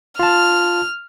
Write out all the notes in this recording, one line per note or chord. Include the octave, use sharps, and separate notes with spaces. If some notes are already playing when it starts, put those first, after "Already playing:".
F4 A5 F6